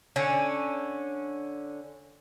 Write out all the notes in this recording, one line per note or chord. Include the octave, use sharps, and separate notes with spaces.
D3 C#4